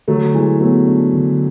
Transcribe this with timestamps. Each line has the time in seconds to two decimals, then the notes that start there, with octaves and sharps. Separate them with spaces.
0.08 D3 F#3 A3
0.34 E3 F#3 G#3
0.60 F#3 A3 B3
0.87 D4
1.13 D3